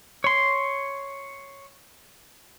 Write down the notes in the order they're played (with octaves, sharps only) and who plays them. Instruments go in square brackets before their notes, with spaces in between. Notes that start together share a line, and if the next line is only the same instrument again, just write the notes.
[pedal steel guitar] C#5 C6